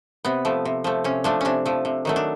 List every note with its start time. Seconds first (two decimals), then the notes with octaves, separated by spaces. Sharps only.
0.25 C3 B3
0.45 F3 A3
0.65 C3
0.84 F3 A3
1.04 C3 C#4
1.24 F3 A3 D4
1.41 C3 C#4 D4
1.66 F3 A3
1.85 C3
2.05 D#3 F#3 A3
2.16 D4